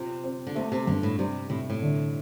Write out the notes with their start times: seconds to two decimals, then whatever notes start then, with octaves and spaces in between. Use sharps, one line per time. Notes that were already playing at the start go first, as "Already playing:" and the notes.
Already playing: C3 C4 F4
0.24 C4
0.47 D3
0.55 C3 A3
0.72 C3
0.87 G2 D3
1.03 A2
1.18 C3 G3
1.49 A2 C3
1.70 A2
1.82 D3